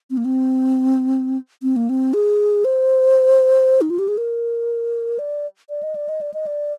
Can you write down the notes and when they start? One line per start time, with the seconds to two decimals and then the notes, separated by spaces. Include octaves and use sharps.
0.10 C4
0.17 A#3
0.25 C4
1.63 C4
1.76 A#3
1.89 C4
2.14 G#4
2.65 C5
3.81 D#4
3.90 F4
3.99 G4
4.08 G#4
4.17 A#4
5.19 D5
5.69 D5
5.83 D#5
5.95 D5
6.09 D#5
6.21 D5
6.34 D#5
6.47 D5